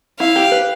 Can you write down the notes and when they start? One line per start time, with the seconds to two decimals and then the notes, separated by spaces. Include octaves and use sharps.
0.20 E4 F5
0.36 G4
0.52 B4